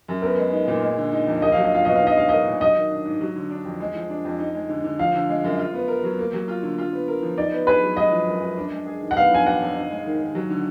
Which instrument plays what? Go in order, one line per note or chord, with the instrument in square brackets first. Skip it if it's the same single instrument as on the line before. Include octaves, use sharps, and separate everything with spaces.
[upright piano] F#2
[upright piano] B3 [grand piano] A#4
[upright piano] G#3
D#4
A#2
G#3
D3
D#4
F2
[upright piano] A#3 [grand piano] D#5
[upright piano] F#3 [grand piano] F5
[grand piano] D#5
[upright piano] F4 [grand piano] F5
[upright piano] B2 [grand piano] D#5
[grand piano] F5
[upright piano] D#4
[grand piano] D#5
[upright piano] G#3 [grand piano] F5
[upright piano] A#4 [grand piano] D#5
[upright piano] A#2
[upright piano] F#3 [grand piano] D#5
[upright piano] D#3
D4
G#2
F#3
D3
D4
F2
G#3
F3
D4
F2
D#4
G#3
D3
D3
[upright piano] F3 [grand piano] F5
[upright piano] D3
G#3
F#2
F4
B3
A#4
F#3
A#3
F#3
F4
D3
F4
B3
A#4
F3
[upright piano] D#4 [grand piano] D5
[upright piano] B3
[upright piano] G#4 [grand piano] B4
[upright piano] F#3
[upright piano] G#3 [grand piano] D#5
[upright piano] F3
F#2
F#2
D4
G#3
G#4
D#3
[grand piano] F#5
[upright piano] B3 [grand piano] F5
[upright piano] F3 [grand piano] G#5
[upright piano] D4 [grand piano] F#5
[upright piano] F2
D#4
G#3
D#3
D#3
F#3
D3